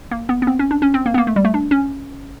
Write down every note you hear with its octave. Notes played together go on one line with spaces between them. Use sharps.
A#3
B3
B3
C4
C#4
D4
C#4
C4
A#3
B3
A#3
A3
G3
A3
D4
C#4